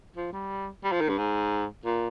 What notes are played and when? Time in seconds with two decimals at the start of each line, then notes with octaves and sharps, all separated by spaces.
0.16 F3
0.33 G3
0.84 G3
0.92 F3
1.01 D#3
1.09 G2
1.18 G#2
1.85 A#2